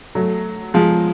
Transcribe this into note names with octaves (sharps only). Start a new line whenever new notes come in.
F#3 A3
F3 G#3